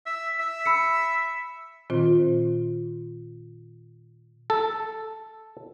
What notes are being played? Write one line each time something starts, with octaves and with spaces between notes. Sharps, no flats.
E5
E5
B5 E6 C#7
A#2 D#3 C4 F4 C5
A4